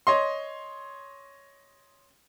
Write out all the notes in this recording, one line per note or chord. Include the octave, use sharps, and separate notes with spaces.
C#5 D#5 C6